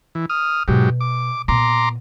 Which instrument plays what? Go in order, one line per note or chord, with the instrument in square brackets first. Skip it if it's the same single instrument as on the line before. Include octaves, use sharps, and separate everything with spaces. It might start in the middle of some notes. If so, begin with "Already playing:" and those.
[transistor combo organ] E3
D#6 F6
[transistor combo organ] G#2 F#3 G4 [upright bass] B2
[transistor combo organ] D6
[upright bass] A#2 B3 [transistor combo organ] A#5 C6 D6